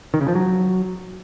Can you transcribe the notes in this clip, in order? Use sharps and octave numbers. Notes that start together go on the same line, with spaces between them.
D#3
C#3
F3
F#3